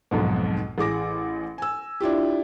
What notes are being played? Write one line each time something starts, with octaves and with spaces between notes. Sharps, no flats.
B1 F2 G#2 B2
A1 G#4 D6 A#6
G#5 E6
D4 E4 F4 G4